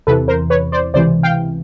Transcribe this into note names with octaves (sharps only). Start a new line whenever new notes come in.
E2 C3 E3 A4 B4
A#4 C5
B4 C#5
C5 D5
C#2 C3 E3 C5 D5
F5 G5